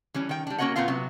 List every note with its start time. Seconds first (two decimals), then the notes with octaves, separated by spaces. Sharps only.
0.14 E3 G3 C#4
0.29 D#3 G5
0.47 G3 D4
0.58 A#3 C#4 F#4 C#5 D#5 F#5
0.76 A#2 B3 C4 F4 F5
0.88 C3 F#3 B3